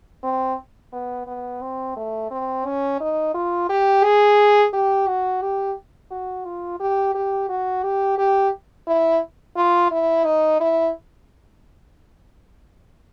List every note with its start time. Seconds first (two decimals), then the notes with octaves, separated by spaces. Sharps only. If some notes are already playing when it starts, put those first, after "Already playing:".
0.23 C4
0.92 B3
1.27 B3
1.61 C4
1.96 A3
2.31 C4
2.65 C#4
3.00 D#4
3.34 F4
3.69 G4
4.03 G#4
4.73 G4
5.07 F#4
5.41 G4
6.11 F#4
6.45 F4
6.80 G4
7.14 G4
7.49 F#4
7.83 G4
8.18 G4
8.87 E4
9.56 F4
9.91 E4
10.25 D#4
10.60 E4